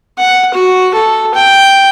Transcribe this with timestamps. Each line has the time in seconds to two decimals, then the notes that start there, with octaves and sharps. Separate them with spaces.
0.19 F#5
0.54 F#4
0.94 A4
1.35 G5